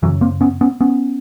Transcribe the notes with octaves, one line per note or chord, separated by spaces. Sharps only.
F#2 C#3 E3 F#3
A#3 C4
B3 C#4
B3 C#4
B3 C#4